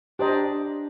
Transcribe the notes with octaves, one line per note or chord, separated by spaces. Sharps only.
D4 G4 C5 D#5 G5 A#5